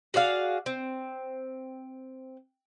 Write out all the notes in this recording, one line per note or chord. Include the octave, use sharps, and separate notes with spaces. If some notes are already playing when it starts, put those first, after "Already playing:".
F#4 G#4 D5 F5
C4